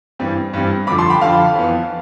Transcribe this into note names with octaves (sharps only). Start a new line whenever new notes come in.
G2 E3 G3 C4
G2 E3 G3 C4
F2 D3 F3 B5 D6
A5 C6
G5 B5
F2 D3 F3 F5 A5
F2 E3 B3